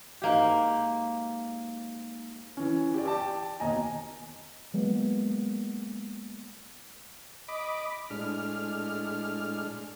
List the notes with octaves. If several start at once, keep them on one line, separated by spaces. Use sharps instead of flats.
G#2 A#3 G4
E3 C#4
G4 D5
G5 A5 D6
D#2 B2 D#5 G#5 A#5
F#3 G#3 A#3 B3
D#5 B5 D6
A2 G#3 D4 F6